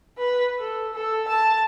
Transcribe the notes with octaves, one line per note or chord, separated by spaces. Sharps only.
B4
A4
A4
A5